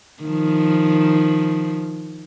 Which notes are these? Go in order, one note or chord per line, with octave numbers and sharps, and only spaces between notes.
D#3 F3